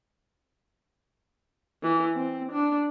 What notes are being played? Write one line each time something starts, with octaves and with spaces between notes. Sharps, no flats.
E3
C4
D4